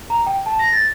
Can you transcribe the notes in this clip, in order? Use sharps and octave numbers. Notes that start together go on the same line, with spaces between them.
A#5
G5
A5
A#6
A6